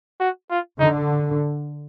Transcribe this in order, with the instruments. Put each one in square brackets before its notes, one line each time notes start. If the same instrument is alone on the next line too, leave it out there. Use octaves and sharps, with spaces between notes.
[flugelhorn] F#4
F4
[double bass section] D3 [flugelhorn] D#4